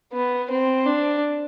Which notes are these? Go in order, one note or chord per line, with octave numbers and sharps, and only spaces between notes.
B3
C4
D4